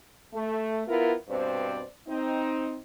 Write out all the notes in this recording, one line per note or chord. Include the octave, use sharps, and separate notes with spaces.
A3
B3 E4 F4 A#4
G2 B2 C4 C5 D5
C4 D#4